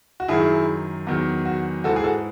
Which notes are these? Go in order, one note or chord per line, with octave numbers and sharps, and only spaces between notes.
F#4
F#2 D#3 F#3 E4 G#4
E2 D#3 F#3
F#4
G#2 E3 F#4 A4
G#4
F#4 A4